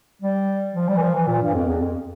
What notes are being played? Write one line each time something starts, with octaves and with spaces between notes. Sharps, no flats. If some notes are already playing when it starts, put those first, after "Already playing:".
G3
F3
G3
E3
F3
E3
A#2
G2
F2
E2
F2